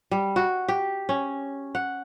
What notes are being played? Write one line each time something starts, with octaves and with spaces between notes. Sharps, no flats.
G3
F#4
G4
C#4
F#5